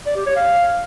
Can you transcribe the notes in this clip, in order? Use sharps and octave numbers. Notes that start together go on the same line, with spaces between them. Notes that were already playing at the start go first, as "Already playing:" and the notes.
D5
G4
C#5
F5